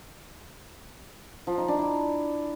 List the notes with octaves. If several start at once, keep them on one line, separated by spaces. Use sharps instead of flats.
F3
D#4
D4
E4